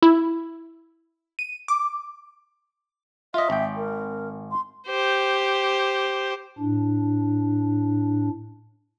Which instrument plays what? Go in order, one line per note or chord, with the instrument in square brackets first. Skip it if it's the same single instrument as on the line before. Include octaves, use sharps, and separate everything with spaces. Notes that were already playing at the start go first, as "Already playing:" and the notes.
[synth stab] E4
D#7
D6
[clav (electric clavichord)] F4 D#5 [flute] E5
[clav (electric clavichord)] G#1 G5
[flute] A#4
C6
[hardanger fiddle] G4 C5
[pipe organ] A2 D4